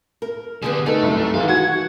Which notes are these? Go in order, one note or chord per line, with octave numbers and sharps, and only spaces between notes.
A#4
D3 B3 G4 G#4
A3 D#4 A4 A#4
C2 F#2
D#3 E3 G#3 A3 F5
F#4 F#5 G#6